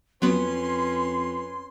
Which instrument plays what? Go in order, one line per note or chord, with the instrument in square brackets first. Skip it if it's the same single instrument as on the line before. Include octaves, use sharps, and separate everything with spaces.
[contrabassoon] F2 [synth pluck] F#3 B3 [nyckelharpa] C#4 B4 [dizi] C6